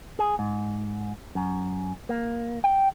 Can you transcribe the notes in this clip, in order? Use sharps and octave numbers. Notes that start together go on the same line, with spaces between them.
G#4
G#2
F#2
A#3
G5